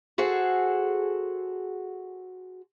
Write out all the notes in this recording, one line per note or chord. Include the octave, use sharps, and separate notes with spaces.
F#4 G#4 A4 C5